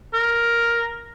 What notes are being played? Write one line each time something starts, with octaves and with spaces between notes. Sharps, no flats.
A#4